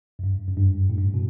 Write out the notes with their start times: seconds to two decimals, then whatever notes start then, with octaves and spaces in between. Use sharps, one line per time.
0.19 F#2
0.24 G2
0.48 F#2
0.57 G2
0.90 A2
0.98 G2
1.14 B2